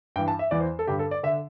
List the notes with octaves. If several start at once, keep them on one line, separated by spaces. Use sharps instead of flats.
G2 E3 G5
A5
E5
E2 E3 D5
C5
A4
G2 D3 G4
A4
D5
D3 E5